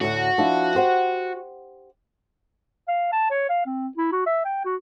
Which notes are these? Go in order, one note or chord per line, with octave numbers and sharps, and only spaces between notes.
D2 A2 F#4
F3 D4 E4
G4 C5 F#5
F5
A5
C#5
F5
C4
E4
F#4
E5
G5
F#4